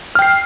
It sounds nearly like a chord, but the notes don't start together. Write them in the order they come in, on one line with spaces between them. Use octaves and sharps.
F6 G5 C7